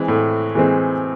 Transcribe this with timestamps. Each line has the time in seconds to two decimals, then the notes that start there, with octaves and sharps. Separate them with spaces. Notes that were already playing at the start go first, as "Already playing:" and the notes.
Already playing: E3 G#3 C4
0.08 A2
0.55 E3 G#3 C4